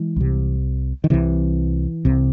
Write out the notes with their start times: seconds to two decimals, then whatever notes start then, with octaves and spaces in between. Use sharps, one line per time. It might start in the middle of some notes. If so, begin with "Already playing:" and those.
Already playing: E3 G#3
0.16 C2 C3
1.04 D#3
1.10 C2 C3 E3
2.05 C2 C3